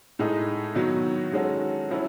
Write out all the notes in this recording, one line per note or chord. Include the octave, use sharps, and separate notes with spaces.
A2 G#3 D#4 A4
D#3 F#3 B3 F#4
D#3 G#3 C#4 F#4 A4
F#3 C#4 E4 A4